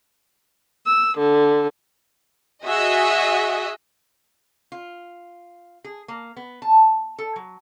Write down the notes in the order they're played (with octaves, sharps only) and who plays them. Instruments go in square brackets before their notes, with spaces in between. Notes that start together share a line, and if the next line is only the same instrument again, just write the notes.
[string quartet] E6
D3
[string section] F#4 G#4 D#5 E5
[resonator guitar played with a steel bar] F4
G#4
A#3
B3
A5
A4
F#3